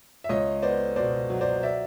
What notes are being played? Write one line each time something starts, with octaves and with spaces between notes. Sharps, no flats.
E5
C#2 C#5 D#5
B3 C5 D5
B2 C5 D5
F#3
C5 D5
D5 E5